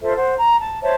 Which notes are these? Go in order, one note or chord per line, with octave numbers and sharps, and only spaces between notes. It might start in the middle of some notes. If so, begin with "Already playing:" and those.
F4 A4 C5 E5
C5 F#5
A#5
A5
C5 C#5 E5 A5